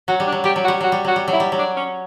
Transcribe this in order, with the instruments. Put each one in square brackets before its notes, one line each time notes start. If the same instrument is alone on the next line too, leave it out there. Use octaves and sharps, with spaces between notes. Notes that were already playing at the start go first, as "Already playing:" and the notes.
[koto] F#3 [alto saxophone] F#4
[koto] G3
[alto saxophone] D4
[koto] F#3
[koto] G3 [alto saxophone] G4
[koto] F#3
[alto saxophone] F#4
[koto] G3
[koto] F#3 [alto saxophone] F#4
[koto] G3
[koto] F#3 [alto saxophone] F#4
[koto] G3
F#3
[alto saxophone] E4
[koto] G3
F#3
[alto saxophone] D4
C#4